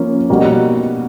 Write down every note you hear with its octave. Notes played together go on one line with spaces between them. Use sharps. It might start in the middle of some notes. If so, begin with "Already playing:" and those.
Already playing: F3 A#3 C#4
B2 G3 A#3 D#4 F#4